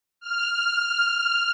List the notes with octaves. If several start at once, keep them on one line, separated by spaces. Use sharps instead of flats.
F6